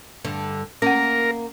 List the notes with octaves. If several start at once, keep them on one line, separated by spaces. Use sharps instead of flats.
G2 D3
A#3 C#4 A#4 F#5